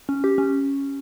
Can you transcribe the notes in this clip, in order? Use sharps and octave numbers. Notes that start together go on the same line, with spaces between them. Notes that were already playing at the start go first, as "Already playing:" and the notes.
C#4
G4
C#4